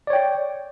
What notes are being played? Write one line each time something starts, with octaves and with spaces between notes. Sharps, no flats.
C#5 D5 G5